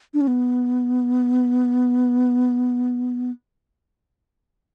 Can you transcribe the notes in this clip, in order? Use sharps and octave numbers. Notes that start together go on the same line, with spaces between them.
D4
C#4
B3